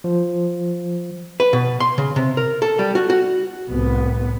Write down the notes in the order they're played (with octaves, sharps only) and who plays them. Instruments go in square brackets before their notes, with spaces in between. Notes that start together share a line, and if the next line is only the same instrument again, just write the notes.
[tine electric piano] F3
[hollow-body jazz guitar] B4
B2
C6
C#3
C3
A#4
A4
G3
F#4
F#4
[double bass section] C2 A2 B3